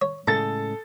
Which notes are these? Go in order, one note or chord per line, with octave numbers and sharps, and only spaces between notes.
C#5
A2 C#3 G#3 A4 A#5 A6